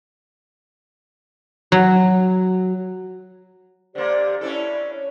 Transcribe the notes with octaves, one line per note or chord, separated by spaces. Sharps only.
F#3
D3 A#3 G4 C5 D5
C#4 D4 E4 A4
C#5